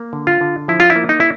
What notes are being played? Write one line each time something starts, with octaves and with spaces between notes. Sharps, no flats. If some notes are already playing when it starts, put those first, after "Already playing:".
Already playing: A#3
D3
F4
D3
F3 E4
F4
E4
A#3
D#4
E4